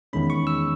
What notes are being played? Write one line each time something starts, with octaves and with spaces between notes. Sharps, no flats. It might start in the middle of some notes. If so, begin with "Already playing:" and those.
E2 D#3 G#3 C#4 B5
C#6
E6